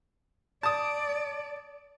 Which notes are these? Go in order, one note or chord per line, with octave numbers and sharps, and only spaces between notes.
D5 A5 D#6